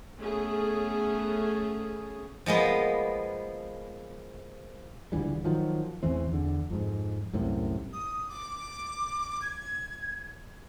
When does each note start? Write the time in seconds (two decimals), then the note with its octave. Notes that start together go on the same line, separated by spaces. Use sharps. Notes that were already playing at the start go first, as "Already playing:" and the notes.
0.18 A3 B3 C#4 G#4
2.46 F3 G#3 A#3 B3
5.12 C#2 D3 E3 G3
5.44 D#3 F3 F#3
6.03 A1 E2 E3 C4
6.32 E2 D3
6.70 F2 G#2
7.33 C2 F#2 A2 C3
7.93 D#6
8.29 D6
9.42 G#6